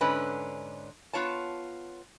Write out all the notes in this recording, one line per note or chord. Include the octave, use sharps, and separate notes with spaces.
G#2 D3 C#4 B4
B3 F4 C#5 A5